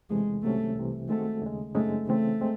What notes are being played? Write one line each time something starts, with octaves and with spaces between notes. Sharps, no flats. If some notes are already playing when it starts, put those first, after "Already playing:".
E2 C3 E3 G#3 A3
C2 C3 D#3 F#3 A3 C#4
C2 C3 E3
D#3 G#3 A3 C4 F#4 A4
D#2 C#3 G#3
F#2 C#3 G#3 A3 C4 D#4
C#3 E3 A3 C4
G#3 C4